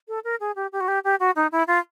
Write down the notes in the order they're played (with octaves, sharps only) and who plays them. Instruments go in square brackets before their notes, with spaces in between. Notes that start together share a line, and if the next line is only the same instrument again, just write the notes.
[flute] A4
A#4
G#4
G4
G4
F#4
G4
G4
F#4
D#4
E4
F4